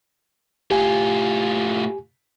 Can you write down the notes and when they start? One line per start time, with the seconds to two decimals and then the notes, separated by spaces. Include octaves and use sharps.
0.71 A2 F4 G4 G#5